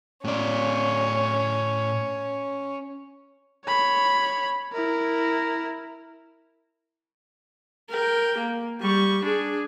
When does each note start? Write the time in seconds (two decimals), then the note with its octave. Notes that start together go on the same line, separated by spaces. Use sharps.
0.24 A2 C#4 D5
3.65 C#5 B5
4.73 E4 A#4
7.90 A#4 G5
8.38 A#3
8.81 G3 C#6
9.23 D4 G#4